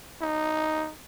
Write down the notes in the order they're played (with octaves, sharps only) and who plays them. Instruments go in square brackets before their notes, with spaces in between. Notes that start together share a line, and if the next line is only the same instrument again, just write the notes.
[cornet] D#4